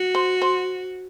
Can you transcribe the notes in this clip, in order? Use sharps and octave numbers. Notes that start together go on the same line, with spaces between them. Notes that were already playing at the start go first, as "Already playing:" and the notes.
Already playing: F#4
C5
C5